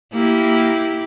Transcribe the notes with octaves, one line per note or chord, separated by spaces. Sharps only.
A#3 E4 G4